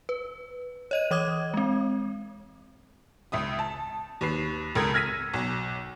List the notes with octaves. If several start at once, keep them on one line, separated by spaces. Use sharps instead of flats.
B4
C#5 D#5 D#7
E3 C#5 D6 D#6 G#6
G#3 C4
C#2 E5 D#6
A5
D#2 B4 C7
C#2 A4 A#4 D#6 G#6
E6 F6 G#6 A#6 B6 D#7
B1